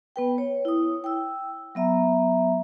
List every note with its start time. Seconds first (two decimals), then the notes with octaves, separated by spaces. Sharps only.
0.16 B3 B4 G5
0.38 C#5
0.65 E4 D#6
1.04 G5 E6
1.75 F#3 B3 E5 A#5